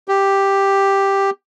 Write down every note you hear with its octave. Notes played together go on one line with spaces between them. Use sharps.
G4